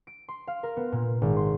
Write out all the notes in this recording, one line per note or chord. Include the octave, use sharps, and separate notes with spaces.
D7
C6
F5
A#4
B3
A#2
G#1
C6